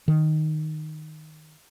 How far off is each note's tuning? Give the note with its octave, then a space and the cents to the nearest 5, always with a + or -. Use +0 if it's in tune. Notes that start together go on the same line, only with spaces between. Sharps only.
D#3 -5